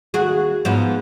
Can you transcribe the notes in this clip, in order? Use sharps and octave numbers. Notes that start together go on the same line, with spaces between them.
D#2 F#4 G#4
G#2 F3 B3